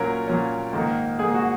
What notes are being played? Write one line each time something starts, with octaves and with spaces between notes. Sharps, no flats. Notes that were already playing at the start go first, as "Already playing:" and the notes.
Already playing: A#2 F#3 C#4 A#4
A#2 F#3 C#4
G#2 D#3 A#3
G#2 D#3 A#3 G#4
F#4